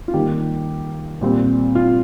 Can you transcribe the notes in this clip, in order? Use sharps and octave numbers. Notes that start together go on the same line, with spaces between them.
F4
D#3 G3 A#3 G4
A#2 G3 C4
F4